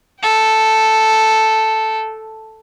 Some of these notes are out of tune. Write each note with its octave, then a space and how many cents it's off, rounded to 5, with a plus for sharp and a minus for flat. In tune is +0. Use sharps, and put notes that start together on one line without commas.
A4 +0 G5 -35